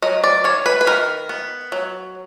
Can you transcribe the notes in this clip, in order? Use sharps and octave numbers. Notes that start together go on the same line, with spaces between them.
F#3 D#5
D5
D#3 C#5
B4
B4
D#3 A#4
B3
F#3